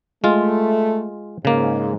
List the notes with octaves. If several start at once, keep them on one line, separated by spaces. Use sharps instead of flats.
G#3 A3 F4
G#2 C#3 A#3